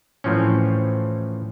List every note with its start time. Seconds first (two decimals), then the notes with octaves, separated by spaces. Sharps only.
0.24 A2 E3 F3 C4 C#4